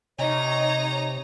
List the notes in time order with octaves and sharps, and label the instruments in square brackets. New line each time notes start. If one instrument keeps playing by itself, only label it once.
[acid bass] C3 [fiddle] D#4 A#5 [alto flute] C#5 [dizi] D#5